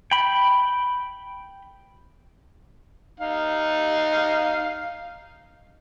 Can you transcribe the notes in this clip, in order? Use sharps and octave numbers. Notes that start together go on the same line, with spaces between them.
G5 B5
D#4 F5